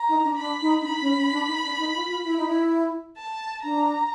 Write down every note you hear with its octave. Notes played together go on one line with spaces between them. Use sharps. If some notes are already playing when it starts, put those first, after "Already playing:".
Already playing: A#5
D#4
D4
D4 B5
D#4
D4
D#4 B5
C#4
C#4
D4
D#4
D4
D#4
F4
F4
E4
D#4
E4
A5
D4 A#5